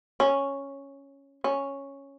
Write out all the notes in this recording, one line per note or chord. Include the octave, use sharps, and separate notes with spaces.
C#4
C#4